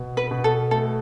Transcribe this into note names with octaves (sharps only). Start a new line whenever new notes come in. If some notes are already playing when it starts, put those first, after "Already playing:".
Already playing: B2
B4
B2
A4
A3 A4